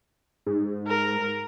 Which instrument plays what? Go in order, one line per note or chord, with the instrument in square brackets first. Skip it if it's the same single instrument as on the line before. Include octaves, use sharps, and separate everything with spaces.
[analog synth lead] G#2
[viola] A#4